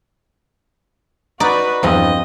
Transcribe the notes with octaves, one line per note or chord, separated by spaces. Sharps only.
D#4 F#4 B4 D5
E2 G2 F3 C4 F4 D#5